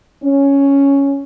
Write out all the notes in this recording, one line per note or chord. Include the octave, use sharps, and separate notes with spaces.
C#4